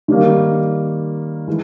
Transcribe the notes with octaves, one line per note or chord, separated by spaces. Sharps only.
D#3 G3 A#3
E3 G#3